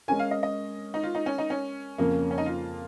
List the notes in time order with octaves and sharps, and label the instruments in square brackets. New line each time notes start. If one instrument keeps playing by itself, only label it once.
[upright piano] G#3 C#4 A#4 [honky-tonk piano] G#5
[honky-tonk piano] F5
D#5
D#5
D#4
F4
D#4
C#4
D#4
C#4
[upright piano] F2 C#3 A#3
[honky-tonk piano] C#4
D#4
F4